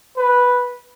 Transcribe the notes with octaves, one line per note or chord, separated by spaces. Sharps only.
B4